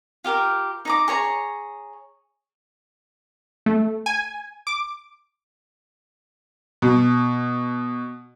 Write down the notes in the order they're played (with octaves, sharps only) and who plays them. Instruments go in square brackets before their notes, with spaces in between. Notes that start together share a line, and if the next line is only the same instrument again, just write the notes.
[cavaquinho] F4 G4 A#4
D#4 A#5 D6
G#4 C#5 A#5
[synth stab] A3
G#5
D6
[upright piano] B2